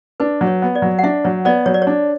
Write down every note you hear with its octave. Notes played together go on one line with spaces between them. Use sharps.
D4 B4
F#3
C#5
B3
D5
F#3
F#5
D4 E5
F#3 C#5
B3 D5
F#3 C#5
D5
C#5
D4